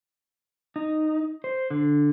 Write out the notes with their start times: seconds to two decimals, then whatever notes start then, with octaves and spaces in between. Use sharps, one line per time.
0.76 D#4
1.44 C5
1.70 D3